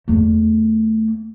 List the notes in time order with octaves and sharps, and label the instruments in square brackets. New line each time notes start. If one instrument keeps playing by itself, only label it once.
[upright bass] E2 A3